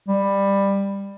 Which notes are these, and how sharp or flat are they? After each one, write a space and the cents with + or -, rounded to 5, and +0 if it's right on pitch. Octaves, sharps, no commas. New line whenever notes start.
G3 +15